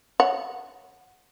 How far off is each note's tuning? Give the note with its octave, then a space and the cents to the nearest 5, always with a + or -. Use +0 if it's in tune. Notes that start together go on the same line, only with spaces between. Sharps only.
C#5 +0 F#5 -5